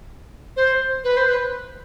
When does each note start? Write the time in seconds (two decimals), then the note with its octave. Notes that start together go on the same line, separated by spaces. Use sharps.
0.56 C5
1.03 B4
1.16 C5
1.28 B4